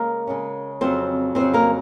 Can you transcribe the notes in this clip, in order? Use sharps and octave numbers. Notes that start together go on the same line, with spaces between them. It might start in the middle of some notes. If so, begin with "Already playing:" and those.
Already playing: C#3 G#3 A#3 A#4
C#3 G#3 C#4
F2 C#3 F#3 C4 C5
F2 C#3 F#3 C4 C5
A#3 A#4